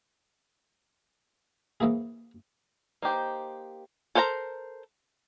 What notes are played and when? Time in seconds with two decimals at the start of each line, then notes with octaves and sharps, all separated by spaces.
1.80 G#2 E3 A#3 E4 G#4
3.02 A#3 D#4 G4 C5
4.15 A4 A#4 C5 F5 A#5